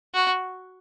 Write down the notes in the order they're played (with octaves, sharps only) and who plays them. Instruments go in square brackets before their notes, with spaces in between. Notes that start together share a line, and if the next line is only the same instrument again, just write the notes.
[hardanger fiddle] F#4